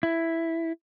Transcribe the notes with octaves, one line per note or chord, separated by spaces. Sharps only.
E4